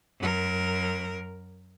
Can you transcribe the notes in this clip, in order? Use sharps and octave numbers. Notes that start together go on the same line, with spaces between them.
F#2 A#4